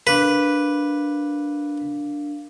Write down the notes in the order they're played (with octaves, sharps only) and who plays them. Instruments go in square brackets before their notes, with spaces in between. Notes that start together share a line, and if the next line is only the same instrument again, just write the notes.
[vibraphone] D4 A#4 F5 [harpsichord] B4